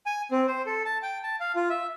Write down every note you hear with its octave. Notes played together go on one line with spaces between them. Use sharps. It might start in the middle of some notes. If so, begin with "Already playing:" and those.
G#5
C4
C5
A4
A5
G5
A5
F5
F4
E5